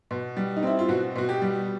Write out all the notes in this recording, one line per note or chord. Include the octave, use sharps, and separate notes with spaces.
B2
G3
D#4
C4 E4
F4
B2 F#4
B2 F#4
G4
G3